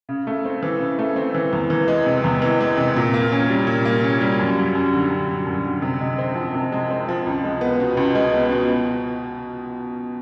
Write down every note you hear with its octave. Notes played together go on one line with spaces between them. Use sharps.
C#3
A3
C4
E3
C#3
A3
C4
E3
E2
E3
G#3
C3
E2
E3
G#3
C3
A#2
A#3
C#4
G3
A#2
A#3
C#4
G3
F#2
F#3
F#2
D3
F#2
F#3
F#2
D3
C3
G#3
C4
F3
C3
G#3
C4
F3
C#2
G#3
B3
B2
C#2
G#3
B3
B2
B2